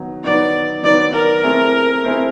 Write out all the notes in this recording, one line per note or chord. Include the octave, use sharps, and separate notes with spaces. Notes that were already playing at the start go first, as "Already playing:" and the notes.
Already playing: D#3 F#3 B3 D#4
D#3 F#3 B3 D#4 D5
D#3 F#3 B3 D#4 D5
A#4
A3 C4 E4 G#4
A3 C4 E4 G#4